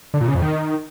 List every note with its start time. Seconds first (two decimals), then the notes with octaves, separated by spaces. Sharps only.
0.14 D3
0.21 A#2
0.28 C#3
0.35 F2
0.42 D#3